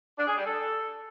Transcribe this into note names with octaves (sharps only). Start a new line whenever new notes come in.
D4
G#4
G3
A4